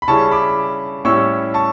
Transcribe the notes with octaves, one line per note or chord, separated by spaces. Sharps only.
B5
C#3 G3 C#4 E4 A5 C#6
B5 D6
A2 G3 C#4 E4 C#6 E6
A5 C#6